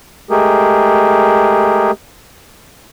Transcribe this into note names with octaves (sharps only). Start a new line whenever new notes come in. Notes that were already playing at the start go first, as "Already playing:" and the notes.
G#3 A3 G4 G#4 A#4